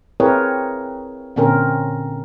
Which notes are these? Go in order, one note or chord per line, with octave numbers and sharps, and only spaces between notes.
C4 E4 G#4 A#4 B4 C#5
A#2 D3 C4 C#4 A#4